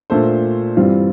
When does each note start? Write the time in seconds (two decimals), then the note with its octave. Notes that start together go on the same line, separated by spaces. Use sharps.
0.10 A#2 A3 D4 A4 C5
0.77 G2 E3 G3 C4 F4